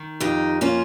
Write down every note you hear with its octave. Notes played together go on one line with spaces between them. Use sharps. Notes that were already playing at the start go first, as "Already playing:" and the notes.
Already playing: D#3
F2 D#4 G4
A#3 C#4 F4